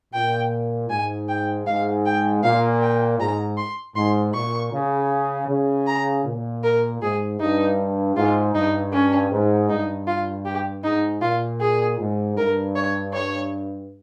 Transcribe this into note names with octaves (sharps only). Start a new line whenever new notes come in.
A#2 G5
G#2 G#5
G5
G#2 F5
G5
A#2 F5
G5
G#2 A#5
C6
G#2 C6
A#2 C#6
C#3
C#3
A#5
A#2
A#4
G#2 G#4
G2 D#4
G#2 F4
G2 D#4
C#4
G#2
G2 D#4
F4
G4
G#2 D#4
A#2 F4
G#4
G#2
G2 A#4
C#5
C#5